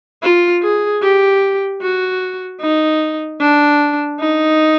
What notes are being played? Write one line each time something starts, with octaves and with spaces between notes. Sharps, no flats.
F4
G#4
G4
F#4
D#4
D4
D#4